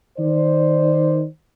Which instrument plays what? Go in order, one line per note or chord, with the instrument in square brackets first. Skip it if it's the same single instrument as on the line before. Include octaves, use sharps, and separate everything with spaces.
[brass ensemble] D#3 C5 D5